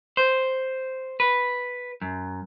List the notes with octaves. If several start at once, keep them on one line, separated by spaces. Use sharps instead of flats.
C5
B4
F#2